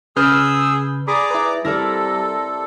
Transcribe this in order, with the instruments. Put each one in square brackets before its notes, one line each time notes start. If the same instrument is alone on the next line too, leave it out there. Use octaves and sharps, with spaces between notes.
[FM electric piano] C#3 B4 G6 [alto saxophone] G#4 [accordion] E6 [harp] F6
[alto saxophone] G#4 [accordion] D5 A#5 D6 [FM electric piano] B5
[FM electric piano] E4 B4
[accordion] C3 A4 [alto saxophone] G3 [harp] E4 A#4 D5 [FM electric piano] A#6